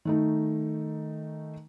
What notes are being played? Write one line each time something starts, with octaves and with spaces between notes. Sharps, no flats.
D#3 A3 D#4